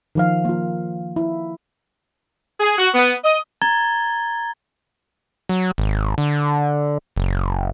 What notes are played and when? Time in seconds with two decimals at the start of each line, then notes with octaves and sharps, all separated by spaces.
0.15 D#3 F3 F5
0.45 A#3 F4
1.16 E4
2.60 G#4
2.78 F#4
2.94 B3
3.23 D#5
3.62 A#5 G#6 A6 G7
5.49 F#3
5.78 G#1
6.18 D3
7.16 F#1